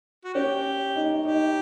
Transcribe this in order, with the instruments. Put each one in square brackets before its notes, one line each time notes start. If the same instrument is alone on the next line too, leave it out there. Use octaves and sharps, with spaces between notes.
[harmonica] F#4
[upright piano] C#4 [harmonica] G4
[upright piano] D#4
[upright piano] D#4 [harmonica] G4